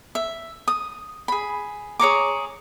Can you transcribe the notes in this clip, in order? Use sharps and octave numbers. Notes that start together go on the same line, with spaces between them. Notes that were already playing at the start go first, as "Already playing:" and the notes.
E5
D#6
G#4 B5
G#4 C#5 A#5 D6